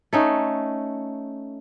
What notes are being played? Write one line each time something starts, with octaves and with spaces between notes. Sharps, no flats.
A3 C#4 D#4